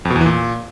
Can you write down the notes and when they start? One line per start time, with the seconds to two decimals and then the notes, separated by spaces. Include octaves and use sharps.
0.05 F2
0.10 B2
0.16 E2
0.21 E3
0.26 A#2